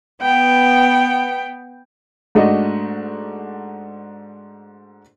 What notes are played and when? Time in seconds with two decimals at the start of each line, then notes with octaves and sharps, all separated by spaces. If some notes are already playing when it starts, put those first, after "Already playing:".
0.22 B3 G5
2.35 G#2 A3 D4 F#4 D#5